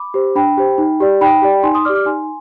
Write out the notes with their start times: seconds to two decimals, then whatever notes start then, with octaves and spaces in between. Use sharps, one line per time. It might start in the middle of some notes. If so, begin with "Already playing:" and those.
Already playing: B5 D6
0.14 G4 C5
0.35 D4 G5 B5
0.57 G4 C5
0.78 D#4
1.01 G4 D5
1.21 D#4 G5 B5
1.42 G4 D5
1.63 D#4 G#5 C6
1.75 C6 D#6
1.85 G4 D5 D6 F6
1.95 D6 F6
2.06 D#4 G#5 C6